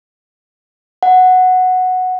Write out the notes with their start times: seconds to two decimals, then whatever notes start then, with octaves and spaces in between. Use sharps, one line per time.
1.03 F#5